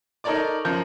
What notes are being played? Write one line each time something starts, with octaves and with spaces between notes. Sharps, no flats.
D#4 A4 A#4 C#5 D5 D6
F#2 F3 A#4 G6